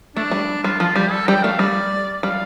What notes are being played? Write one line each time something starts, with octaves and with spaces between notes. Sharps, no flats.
A3 D4
G3
G3 F4
F3 F4
G3 G4
A4
G3 G5
A3 F5
G3 D5
G3 F5